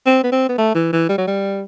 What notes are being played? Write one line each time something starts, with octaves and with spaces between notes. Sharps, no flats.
C4
B3
C4
B3
A3
E3
E3
G3
F#3
G3